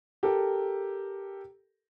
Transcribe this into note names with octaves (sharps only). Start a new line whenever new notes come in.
G4 A4 A#4